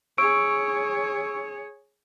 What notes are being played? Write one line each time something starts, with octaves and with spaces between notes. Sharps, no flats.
G#4 C#5 C#6 E6 D7